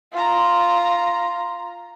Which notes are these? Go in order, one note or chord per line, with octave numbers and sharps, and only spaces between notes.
F4 A#5